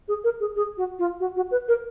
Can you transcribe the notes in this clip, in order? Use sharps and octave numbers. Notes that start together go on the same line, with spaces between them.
G#4
A#4
G#4
G#4
F#4
F4
F#4
F#4
B4
A#4